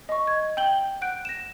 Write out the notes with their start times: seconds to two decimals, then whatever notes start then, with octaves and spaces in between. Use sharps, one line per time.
0.09 D#5 C#6
0.27 G#6
0.57 G5 G6 F#7 G7
1.01 F#5 F#6 G6 D7
1.25 A#6 E7